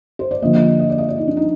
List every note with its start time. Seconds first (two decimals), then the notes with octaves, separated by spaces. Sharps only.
0.19 C5
0.31 D5
0.42 D3 F3 A#3 D#5
0.55 D#5
0.79 D#5
0.90 D5
0.98 D#5
1.08 D5
1.18 D#4
1.28 D4
1.37 D#4